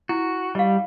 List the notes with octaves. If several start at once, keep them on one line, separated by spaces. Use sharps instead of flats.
E4 F#4
G3 D#5 F5